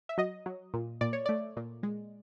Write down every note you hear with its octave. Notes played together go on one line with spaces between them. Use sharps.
E5
F#3 D#5
F#3
A#2
A#2 D5
C#5
A3 D5
A#2
G#3